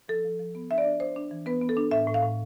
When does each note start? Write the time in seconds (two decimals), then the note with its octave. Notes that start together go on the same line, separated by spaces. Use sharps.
0.08 F3 A4
0.24 F3
0.39 F3
0.55 B3
0.71 D4 E5
0.78 D5
0.85 D4
1.00 D4 C5
1.16 D4
1.31 E3
1.46 B3 B4
1.61 B3
1.69 A4
1.77 D4
1.91 A2 E5
2.07 A2
2.14 F5
2.23 A2